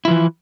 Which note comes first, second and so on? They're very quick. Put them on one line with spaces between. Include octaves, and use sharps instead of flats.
E4 F3 E3